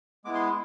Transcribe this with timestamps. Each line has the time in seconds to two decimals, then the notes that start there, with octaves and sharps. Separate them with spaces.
0.25 G#3 B3 E4 D6
0.35 C6